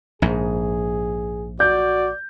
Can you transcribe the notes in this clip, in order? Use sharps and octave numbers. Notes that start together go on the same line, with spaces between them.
A#1 G#2 G#4
F#4 D5 G6